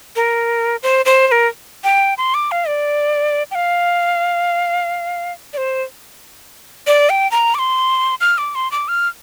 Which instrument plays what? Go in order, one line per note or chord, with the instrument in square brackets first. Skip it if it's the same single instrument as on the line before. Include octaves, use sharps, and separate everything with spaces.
[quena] A#4
C5
C5
C5
A#4
G5
C6
D6
F5
D5
G5
F5
D5
C5
D5
G5
A#5
D6
C6
F6
D6
C6
D6
F6